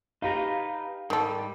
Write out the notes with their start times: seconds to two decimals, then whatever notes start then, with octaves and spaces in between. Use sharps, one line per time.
0.22 D#4 G4 B4 F5 A#5
1.10 G#2 D#3 G3 A4